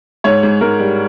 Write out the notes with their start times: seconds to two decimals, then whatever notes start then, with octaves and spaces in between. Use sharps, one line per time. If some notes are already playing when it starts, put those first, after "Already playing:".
0.24 G#2 C#5
0.43 G#2
0.61 G#2 A#4
0.80 G3